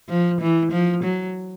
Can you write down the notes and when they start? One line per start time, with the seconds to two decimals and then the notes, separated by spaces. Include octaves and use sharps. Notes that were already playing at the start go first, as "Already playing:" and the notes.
0.09 F3
0.41 E3
0.72 F3
1.03 F#3